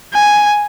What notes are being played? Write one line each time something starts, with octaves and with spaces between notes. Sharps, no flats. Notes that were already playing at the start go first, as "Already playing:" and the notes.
G#5